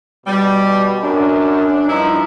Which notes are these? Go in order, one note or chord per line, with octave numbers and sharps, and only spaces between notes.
B2 G3
F#2 D4
G2 F3 D#4 E4